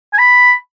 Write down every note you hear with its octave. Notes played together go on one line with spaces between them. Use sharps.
G#5
B5